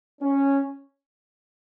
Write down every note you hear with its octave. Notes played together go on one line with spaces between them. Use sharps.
C#4